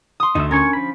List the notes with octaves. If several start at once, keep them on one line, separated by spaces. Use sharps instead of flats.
C6 D#6
D2 D#4 E5
C#4 A#4 G#5 C#6
F3 B5